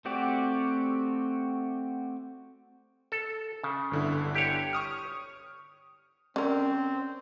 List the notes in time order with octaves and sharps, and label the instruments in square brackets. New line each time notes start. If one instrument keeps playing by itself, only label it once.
[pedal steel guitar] A3 C4 F#4 G4 D5
[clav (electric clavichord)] A4
C#3
[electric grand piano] G1 D3 E4
[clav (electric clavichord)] G4 C#5
[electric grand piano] C#6 D#6 F6
[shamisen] D3 A#4 [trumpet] C4 [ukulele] C#4